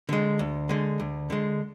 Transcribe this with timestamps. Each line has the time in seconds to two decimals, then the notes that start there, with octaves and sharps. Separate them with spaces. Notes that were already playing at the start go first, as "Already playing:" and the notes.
0.09 D3 G#3
0.39 D2
0.69 D3 G#3
1.00 D2
1.30 D3 G#3